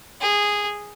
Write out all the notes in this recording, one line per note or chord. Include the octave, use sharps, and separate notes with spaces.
G#4